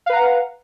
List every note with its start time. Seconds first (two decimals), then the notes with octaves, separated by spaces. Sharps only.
0.06 F5
0.10 B4
0.13 A#5
0.16 F#5